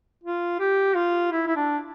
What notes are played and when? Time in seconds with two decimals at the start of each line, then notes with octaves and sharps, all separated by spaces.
0.23 F4
0.59 G4
0.95 F4
1.32 E4
1.47 E4
1.56 D4